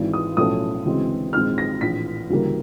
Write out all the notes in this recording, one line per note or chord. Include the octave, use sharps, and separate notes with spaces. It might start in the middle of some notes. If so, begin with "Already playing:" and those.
Already playing: G#1 G#2 E3
D#6
B1 A2 F3 A3 C#4 D#6
D2 C#3 E3 G#3 C4
A#1 G#2 D#3 G#3 C4 F6
A#6
A#1 A2 E3 A3 B6
D2 C#3 E3 G3 A#3